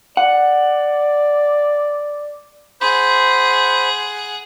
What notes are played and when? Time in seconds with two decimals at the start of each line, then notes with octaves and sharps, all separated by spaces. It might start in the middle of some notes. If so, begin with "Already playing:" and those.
0.17 D5 F#5
2.81 G#4 C5 F#5 B5